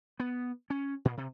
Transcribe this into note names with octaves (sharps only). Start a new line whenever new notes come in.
B3
C#4
A#2
C3